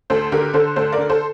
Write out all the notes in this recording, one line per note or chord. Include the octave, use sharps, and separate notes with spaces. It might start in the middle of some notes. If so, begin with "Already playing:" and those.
D2 A4 C5
D3 G4 A#4
D3 A4 C5
D2 A4 C5
A#4 D5
D3
A4 C5